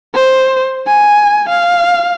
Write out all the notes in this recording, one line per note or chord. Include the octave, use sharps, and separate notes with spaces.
C5
G#5
F5